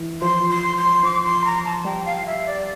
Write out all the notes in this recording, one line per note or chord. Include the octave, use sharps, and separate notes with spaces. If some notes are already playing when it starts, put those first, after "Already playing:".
Already playing: E3 E4
F3 F4 C6
C6
C6
F3 F4 D6
C6
A#5
A5
G3 G4 G5
F5
E5
D5